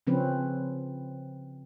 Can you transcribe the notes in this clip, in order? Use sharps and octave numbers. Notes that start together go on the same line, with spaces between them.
C#3 F3 C4 C#4 B4